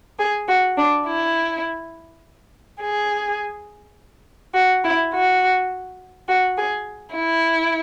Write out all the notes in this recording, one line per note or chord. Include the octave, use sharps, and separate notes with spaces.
G#4
F#4
D4
E4
G#4
F#4
E4
F#4
F#4
G#4
E4